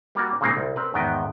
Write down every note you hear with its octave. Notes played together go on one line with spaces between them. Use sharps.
G3 A#3 F#4 D5 A#5
A#2 C#3 G#3 A#3 C4 D#4
C2
C4 A#4 B4
E2 G#2 D#3 B3 D#5 G5